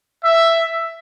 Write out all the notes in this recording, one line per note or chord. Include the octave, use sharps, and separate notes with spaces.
E5